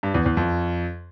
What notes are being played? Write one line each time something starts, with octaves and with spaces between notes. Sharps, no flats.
G2
E2
E2
F2